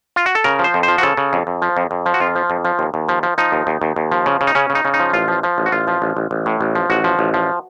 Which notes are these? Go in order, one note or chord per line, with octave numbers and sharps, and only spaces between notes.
F4
F#4
A4
C#3 A#4
F3
C5
F2
C5
F3
F#4
C#3 A4
C#3
F2
F2
F3
F2
F2
F3
F#4
F2 F4
F3
F2
F3
D#2
D#2
F3
F3
F3 D#4
D#2
D#2
D#2
D#2
F3
C#3
C#3
D#4
C#3 C#4
C#3
D#4
C#3
D#4
F3
A1 F4
F3
F3
A1
F#4
A1 F4
F3
A1
A1
A1
A2
A1
F3
A1 F#4
F3
A1
F3